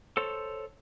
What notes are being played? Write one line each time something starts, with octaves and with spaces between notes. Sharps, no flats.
A4 C5 C#5